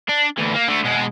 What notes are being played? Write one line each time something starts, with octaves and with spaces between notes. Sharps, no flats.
D4
D2 E3
A#3
D3 A3
B2 G#3